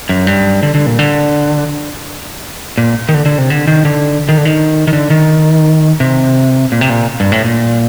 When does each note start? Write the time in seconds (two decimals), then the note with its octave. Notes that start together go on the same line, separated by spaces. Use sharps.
0.09 F#2
0.27 G2
0.63 D3
0.75 D3
0.86 A#2
0.99 D3
2.78 A#2
3.09 D#3
3.14 D3
3.26 D3
3.38 C3
3.50 D3
3.67 D#3
3.85 D3
4.29 D#3
4.38 D3
4.45 D#3
4.87 D#3
4.93 D3
5.10 D#3
6.00 C3
6.72 A#2
6.81 C3
6.90 A#2
7.20 G2
7.32 A2
7.44 A#2